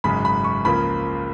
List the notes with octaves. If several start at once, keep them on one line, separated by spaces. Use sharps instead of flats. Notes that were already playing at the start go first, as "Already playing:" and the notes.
G#1 F#2 C#3 G#3 B5
B5
C#6
C#2 C#3 F3 A#3 B5